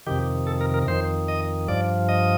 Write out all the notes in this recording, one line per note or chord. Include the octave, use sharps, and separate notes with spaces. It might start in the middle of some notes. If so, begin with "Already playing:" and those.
F2 C3 D#3 G4
A4
A#4
A#4
F2 D#3 C5
D#5
G2 F3 D5
D#5